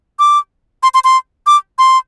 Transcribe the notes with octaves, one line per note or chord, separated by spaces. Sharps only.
D6
C6
C6
C6
D6
C6